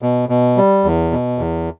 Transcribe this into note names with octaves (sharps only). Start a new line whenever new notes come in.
B2
B2
G3
E2
B2
E2